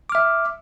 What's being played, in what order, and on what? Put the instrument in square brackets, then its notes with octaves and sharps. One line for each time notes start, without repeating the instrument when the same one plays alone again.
[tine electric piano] D6
F6
E5